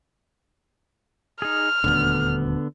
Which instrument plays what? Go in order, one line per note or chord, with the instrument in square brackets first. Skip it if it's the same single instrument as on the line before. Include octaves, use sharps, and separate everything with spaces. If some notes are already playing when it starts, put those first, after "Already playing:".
[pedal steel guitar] D#4 G#4 [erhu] F6
[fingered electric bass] D#1 D2 [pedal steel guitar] D3 B3